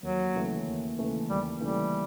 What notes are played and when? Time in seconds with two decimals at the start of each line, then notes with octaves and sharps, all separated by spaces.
0.03 D#2 F#3
0.34 C#3 E3 A3
0.67 D#2
0.98 C#3 E3 A3
1.29 D#2 G3
1.61 C#3 E3 G3 A3